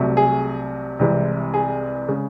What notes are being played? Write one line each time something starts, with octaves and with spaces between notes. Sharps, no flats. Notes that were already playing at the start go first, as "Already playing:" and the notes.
Already playing: C2 C3 F#3 A3
G#4
C2 C3 E3 G#3
G#4
C#3 G#3